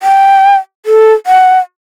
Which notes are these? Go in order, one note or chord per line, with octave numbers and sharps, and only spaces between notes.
G5
A4
F#5